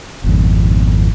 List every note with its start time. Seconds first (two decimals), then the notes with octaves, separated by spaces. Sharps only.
0.24 G#1 F2